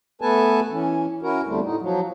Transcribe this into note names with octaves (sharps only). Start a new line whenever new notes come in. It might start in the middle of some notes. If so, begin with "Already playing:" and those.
A3 B3 A4 B4 G#5 A5
E3 C#4
C#4 E4 F#4 A#4
E2 D3 G3 A3 C4
A2 D#4
F3 F#3